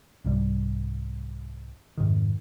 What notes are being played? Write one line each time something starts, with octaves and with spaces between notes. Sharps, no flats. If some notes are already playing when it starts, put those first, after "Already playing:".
C2 G#2 C3 G3
F2 G#2 C3 D#3